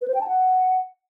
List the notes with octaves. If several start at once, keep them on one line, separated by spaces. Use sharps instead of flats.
B4
C5
G5
A5
F#5